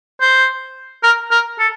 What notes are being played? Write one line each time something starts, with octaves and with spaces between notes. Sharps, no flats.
C5
A#4
A#4
A4